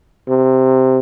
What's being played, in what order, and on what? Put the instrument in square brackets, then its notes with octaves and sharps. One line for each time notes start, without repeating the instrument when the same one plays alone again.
[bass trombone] C3